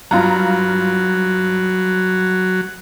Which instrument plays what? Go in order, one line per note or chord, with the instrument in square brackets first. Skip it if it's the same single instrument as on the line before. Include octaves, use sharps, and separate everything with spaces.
[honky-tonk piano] G2 F4 A#5 [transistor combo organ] F#3